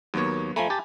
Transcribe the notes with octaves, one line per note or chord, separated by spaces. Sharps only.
D#2 F#3 A#3 B3 C#5
F3 A3 G#5 A#5 B5
G4 A5